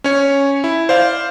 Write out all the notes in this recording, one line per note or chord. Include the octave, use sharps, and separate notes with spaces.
C#4 C#5
E4
C5 D5 F5